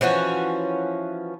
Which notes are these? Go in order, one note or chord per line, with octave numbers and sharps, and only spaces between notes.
E3 F3 C#4 F#4